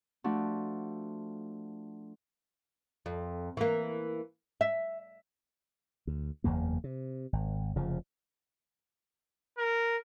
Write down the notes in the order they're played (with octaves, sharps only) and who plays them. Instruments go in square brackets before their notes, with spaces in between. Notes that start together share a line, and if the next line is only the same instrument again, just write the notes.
[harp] F3 A3 D4 F#4
[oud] F2
E3 A#3
E5
[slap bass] D2
F#1 E2 C#3 A#3
C3
G#1
F1 C#3 F3
[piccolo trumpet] A#4